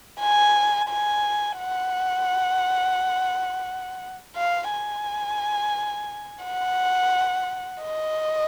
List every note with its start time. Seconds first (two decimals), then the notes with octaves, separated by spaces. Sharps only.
0.20 G#5
0.89 G#5
1.59 F#5
4.36 F5
4.71 G#5
6.45 F#5
7.83 D#5